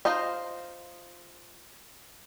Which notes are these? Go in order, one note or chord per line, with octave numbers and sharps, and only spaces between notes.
D#4 F4 C5 D#5